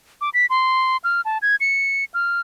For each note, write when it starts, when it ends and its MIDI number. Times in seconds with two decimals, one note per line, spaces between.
0.21 0.30 86
0.34 0.46 95
0.50 0.97 84
1.04 1.21 89
1.25 1.38 81
1.42 1.56 92
1.60 2.05 97
2.14 2.40 89